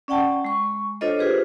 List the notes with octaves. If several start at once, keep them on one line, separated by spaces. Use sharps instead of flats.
C#4 D5 F#5 G5 A5
G#3 C#6
D4 F4 A4 C5 C#5 D#5
F4 G4 G#4 B4 C5